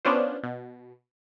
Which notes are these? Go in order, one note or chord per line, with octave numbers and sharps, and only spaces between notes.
B3 C#4 D4 F4 C5
B2